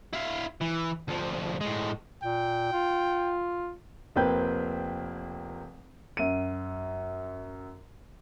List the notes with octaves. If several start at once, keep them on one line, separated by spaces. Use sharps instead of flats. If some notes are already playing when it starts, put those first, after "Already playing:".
E4 F5
E3
D2 F3
A2 G#3
A#2 G5
F4
F1 A#3 C4 B4 G5 G6
F#2 D#7